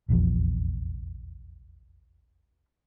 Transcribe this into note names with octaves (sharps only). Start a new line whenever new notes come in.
F1 A#1 E2 F3